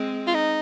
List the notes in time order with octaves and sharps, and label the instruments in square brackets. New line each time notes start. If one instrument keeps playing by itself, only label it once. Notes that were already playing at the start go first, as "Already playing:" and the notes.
Already playing: [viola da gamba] G#3 C4
[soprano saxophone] F4
D#4